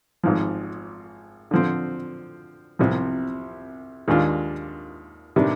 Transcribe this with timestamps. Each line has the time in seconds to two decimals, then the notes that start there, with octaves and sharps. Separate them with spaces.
0.24 G#1 G#2 F3
1.51 D3 F3 C4
2.79 C2 C3 F3
4.08 D#2 D#3 G#3 D4 F4
5.36 C3 D#3 G3 D4